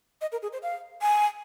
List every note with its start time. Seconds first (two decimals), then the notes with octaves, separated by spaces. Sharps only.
0.21 D#5
0.32 A#4
0.42 G#4
0.53 C5
0.63 F5
1.02 G#5